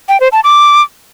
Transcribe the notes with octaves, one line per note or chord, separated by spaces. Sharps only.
G5
C5
A5
D6